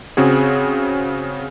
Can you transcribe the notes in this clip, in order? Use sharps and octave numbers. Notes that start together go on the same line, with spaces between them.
C#3 C4 F#4 G#4